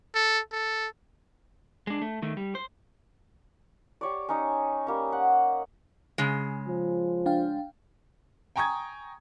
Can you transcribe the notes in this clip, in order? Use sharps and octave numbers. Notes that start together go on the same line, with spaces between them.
A4
A4
G#3 D4
A3
D#3 A3
G3
C5
G4 C#5 D5
C#4 D#4 C#5
G3 A#3 C#4
F#5
C#3 G#3
F3
D4 F5 G5
G5 G#5 A#5 C#6 D#6 G#6